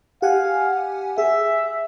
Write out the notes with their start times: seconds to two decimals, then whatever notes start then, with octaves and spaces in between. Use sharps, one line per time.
0.22 G4 F5 F#5 G#5
1.18 G#4 E5